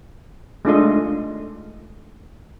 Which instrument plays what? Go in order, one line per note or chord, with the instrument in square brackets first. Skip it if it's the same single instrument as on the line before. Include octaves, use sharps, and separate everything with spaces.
[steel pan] G#3 A3 D4 F4 A4 D#5